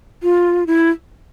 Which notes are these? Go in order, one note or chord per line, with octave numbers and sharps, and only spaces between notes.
F4
E4